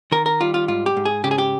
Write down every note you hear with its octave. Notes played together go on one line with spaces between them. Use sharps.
D#3 A#4
A#4
G3 F4
F4
G#2 F4
G4
G#2
G#4
C#3 G4
G#4
G4